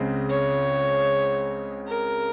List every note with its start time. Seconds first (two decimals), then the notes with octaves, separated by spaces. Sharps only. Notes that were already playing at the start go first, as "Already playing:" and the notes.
Already playing: C#2 C#3 G#3 C4
0.30 C#5
1.88 A#4